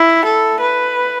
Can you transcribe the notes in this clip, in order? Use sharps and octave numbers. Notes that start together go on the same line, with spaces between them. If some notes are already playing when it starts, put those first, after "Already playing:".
Already playing: E4
A4
B4